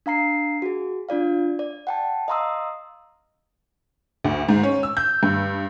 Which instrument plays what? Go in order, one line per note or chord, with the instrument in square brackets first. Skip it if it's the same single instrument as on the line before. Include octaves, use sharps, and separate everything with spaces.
[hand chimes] D4 F5 A#5 C7
F#4 G#4
D4 F4 D5 F5
D5
F#5 G5 A5
D#5 F5 A#5 C6 D#6 E6
[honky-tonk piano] D2
G#2
C#4
E6
G6
G2